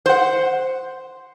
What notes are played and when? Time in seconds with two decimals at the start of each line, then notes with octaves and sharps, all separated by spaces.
0.06 C5 F#5